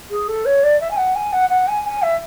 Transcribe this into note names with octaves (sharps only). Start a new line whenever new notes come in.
G#4
A4
C#5
D5
E5
G#5
F#5
G#5
F#5
F#5
G#5
G#5
E5